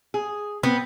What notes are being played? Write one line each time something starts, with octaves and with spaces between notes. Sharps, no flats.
G#4
B3 C4